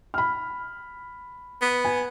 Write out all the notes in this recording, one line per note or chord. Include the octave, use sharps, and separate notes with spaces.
B5 F6
B3
G#5